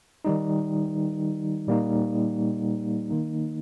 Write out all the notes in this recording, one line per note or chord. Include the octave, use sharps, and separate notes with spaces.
D#3 G3 D#4
A#2 G3 A#3 D#4
D#3 A#3 D#4